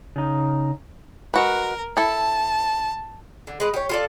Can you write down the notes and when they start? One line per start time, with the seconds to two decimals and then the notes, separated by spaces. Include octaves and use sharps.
0.16 C#3 D#4
1.34 G#3 F#4 A#4 B4
1.97 E4 A4 A5
3.47 D3
3.60 G#3 B4
3.74 G4 C#5
3.89 F4 A4 D5